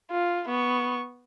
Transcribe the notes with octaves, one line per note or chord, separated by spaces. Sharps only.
F4
B3 C#6